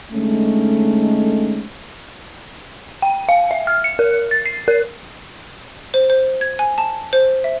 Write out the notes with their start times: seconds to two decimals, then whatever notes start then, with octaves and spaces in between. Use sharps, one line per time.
0.12 D3 G#3 A3 C#4 D#4 A4
3.02 G5
3.29 F5
3.51 E5
3.67 F6
3.84 C#7
3.99 A#4
4.31 A6
4.46 C7
4.68 A#4
5.94 C5
6.10 C5
6.41 G#6
6.59 G#5
6.78 A5
7.13 C5
7.44 E5